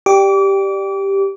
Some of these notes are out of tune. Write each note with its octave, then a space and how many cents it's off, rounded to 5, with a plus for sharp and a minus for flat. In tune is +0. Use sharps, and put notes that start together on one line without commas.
G4 +0 D5 +15 D6 -35